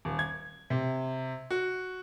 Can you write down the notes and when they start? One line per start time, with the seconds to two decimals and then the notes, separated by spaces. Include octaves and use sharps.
0.05 D#1
0.19 G#6
0.70 C3
1.50 F#4